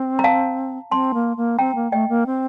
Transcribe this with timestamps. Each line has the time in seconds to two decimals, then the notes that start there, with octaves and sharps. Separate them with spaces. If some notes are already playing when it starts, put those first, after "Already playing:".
Already playing: C4
0.19 A#5
0.24 F5 A5
0.91 C4 A5 C6
1.14 A#3
1.37 A#3
1.59 C4 G5 A#5
1.75 A#3
1.92 A3 D#5 G5
2.09 A#3
2.26 C4